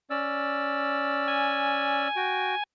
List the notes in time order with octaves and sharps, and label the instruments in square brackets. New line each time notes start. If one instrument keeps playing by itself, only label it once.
[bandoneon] C#4 D5 E6
[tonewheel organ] G#5
[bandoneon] F#4 G5